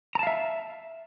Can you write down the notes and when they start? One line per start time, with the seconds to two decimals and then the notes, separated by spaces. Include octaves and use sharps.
0.15 A#5
0.19 A5
0.23 F5
0.27 E5